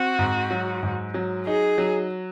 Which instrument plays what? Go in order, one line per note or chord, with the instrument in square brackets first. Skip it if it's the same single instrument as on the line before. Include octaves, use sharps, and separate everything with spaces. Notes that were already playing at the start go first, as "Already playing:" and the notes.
Already playing: [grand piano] C4 [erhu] F#4
[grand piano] G#2
F#3
G#2
F#3
[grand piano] D#4 [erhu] G#4
[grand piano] F#3